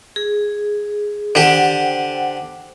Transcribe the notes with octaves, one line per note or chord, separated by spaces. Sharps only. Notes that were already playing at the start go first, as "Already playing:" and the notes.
G#4
D3 G4 C5 F#5 G5